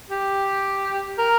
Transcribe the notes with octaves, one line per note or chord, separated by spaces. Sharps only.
G4
A#4